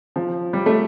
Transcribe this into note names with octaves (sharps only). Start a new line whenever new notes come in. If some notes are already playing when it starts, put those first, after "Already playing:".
F3
G3
A3